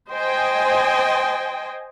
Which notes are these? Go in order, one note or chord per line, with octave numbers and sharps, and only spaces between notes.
C5 D#5 G5 G#5